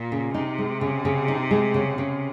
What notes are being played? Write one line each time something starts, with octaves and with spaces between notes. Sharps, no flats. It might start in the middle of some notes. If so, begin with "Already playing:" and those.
Already playing: A#2
C#3
C3 D#4
G#3
C#3
C#3
D#4
G#3
C#3
C#3